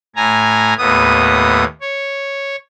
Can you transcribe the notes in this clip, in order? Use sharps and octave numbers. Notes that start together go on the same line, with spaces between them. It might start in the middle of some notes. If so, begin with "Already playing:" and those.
A2 G#5 A#5
D#2 A2 B3 D#6
C#5